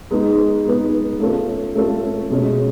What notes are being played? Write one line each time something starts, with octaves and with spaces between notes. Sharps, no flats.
G#3 B3 D#4
G#3 B3 D#4
A3 C#4 F4 A4
A3 C#4 F4 A4
B2 G#3 C#4